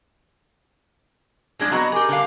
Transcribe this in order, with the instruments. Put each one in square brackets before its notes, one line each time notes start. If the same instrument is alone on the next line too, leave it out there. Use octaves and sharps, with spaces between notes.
[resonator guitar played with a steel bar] F3 G#3 D4 [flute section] G#6
[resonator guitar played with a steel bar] F#3 B3 F#4 [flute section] D#5 C#6
[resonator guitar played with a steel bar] G4 G#4 [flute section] A#4 G#5 D6
[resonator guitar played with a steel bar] D3 G3 F5